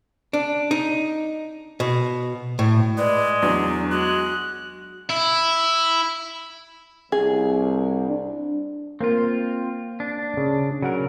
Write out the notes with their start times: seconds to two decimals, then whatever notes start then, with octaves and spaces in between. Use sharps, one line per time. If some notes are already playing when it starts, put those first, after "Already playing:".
0.33 D4
0.71 D#4
1.80 B2
2.59 A2
2.97 G#3 B4 D5
3.42 E2 F#3 D4
3.91 G#3 F#4 F#6
5.10 E4
7.12 C2 G#4
8.08 D4
9.01 A#3 C4 F4 A#4
10.00 D4
10.37 C#3
10.82 C#3 F#3 A#4 F#5